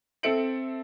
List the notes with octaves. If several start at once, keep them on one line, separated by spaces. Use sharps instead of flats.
C4 A4 E5 C#7 D7 F#7